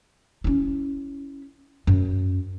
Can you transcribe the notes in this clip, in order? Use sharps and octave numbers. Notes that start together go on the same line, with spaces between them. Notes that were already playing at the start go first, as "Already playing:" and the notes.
C#4 E4
F#2